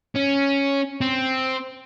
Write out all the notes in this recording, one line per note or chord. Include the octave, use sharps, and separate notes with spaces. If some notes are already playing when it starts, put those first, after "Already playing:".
C#4
C4